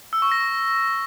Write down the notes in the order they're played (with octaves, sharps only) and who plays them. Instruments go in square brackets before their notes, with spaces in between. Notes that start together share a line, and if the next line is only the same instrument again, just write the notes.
[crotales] E6
C#6
A#6